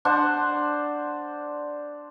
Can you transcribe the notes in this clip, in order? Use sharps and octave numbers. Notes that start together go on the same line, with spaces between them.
D4 C5 F#5